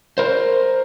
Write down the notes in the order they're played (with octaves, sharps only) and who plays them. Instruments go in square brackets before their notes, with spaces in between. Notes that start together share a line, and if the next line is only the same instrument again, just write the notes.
[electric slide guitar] A#4 C5